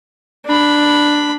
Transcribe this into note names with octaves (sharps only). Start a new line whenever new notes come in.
D4 B5